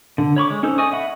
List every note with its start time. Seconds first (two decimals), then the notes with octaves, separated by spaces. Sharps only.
0.18 D3
0.36 C#5 B5 C#6 D6
0.50 G#3
0.63 C#4 D#4 A4 C5
0.78 D5 D#5 G#5 C#6 D#6
0.92 E5 F#5 B5